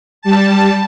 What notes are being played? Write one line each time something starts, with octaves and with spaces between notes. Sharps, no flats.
G3 A5